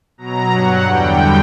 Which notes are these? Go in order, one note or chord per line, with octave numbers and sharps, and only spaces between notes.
B2 F#3 A#5
G2 F#3 F#5
E2 D3 G3 G5